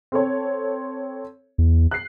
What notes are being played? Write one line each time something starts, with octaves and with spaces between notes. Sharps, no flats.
C4 A4 C#5
E2
F#6 C7